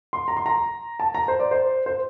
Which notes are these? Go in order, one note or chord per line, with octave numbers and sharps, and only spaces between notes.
C6
A#5
C6
A#5
A5
A#5
C5
D5
C5
C5